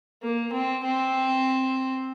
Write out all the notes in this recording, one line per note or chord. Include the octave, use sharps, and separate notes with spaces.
A#3
C4
C4